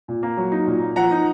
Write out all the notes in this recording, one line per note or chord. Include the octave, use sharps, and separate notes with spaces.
A#2
A#3
F#3
D#4
A#2
A#3
F3 F#5 A#5
D#4